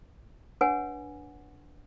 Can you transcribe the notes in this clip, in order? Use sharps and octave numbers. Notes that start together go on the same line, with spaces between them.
D4 B4 C#5 F#5 G#5